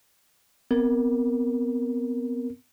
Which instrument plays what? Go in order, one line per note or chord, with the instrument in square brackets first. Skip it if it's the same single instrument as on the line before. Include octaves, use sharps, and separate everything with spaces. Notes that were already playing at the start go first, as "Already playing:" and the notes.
[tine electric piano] B3 C4 A#4